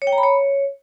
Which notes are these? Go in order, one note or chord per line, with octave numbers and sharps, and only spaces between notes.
C#5
G5
A#5
B5
C#5